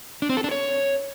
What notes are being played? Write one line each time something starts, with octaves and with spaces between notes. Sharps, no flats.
D4
C4
A4
D4
C#5